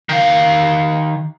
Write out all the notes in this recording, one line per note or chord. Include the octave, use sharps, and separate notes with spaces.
D#3 F5